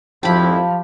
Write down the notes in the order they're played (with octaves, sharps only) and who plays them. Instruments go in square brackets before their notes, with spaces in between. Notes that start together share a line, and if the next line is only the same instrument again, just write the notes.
[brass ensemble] G#1 F2 E4 [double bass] F3 [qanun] G4 B5 [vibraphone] F5 A5